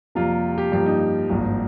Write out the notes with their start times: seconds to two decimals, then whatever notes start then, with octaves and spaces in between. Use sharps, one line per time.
0.15 F2 C3 G3 A#3 F4
0.58 G4
0.72 G2 F3 A#3 G4
0.86 D#4
1.29 G#1 G2 F3 A#3